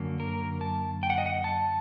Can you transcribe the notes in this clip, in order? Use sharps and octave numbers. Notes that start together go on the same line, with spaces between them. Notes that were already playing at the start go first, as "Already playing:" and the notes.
Already playing: F#2 D3 F#3 A#3
A#4
A5
G5
F#5
D#5
F#5
A5